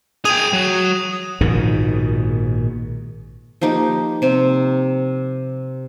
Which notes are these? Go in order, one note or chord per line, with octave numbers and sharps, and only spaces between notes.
G#4 G5 D#6 D#7 F7
F#3
A#1 G#2 B2 D#3
F3 A#3 D#4 G4
C3 C4